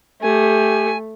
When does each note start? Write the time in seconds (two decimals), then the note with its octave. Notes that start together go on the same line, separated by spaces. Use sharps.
0.22 A3 G4 G#5